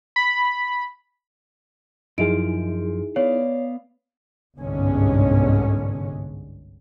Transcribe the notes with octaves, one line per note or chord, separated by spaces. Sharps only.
B5
F#2 F3 D#4 E4 G#4 D7
B3 C#5 D5 F5
G1 C2 G#2 D3 G#3 C#4